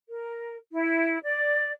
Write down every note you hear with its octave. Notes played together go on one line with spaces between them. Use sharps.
A#4
E4
D5